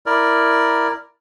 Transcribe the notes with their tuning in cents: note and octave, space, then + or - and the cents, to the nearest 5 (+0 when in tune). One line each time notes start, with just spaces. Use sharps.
E4 +0 A#4 +0 D5 +0